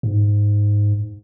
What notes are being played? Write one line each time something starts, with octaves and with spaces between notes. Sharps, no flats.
G#2